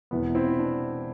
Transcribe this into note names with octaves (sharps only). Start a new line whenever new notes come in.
E1 E2 C3 E3 B3
C4 E4
B3 D4